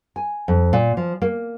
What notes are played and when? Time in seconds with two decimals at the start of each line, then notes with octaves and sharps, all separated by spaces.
0.16 G#5
0.48 F2
0.73 A#2
0.97 F3
1.22 A#3